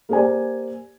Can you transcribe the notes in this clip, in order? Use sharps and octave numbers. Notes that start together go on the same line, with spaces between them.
A#3 G4 C5 D5 G#5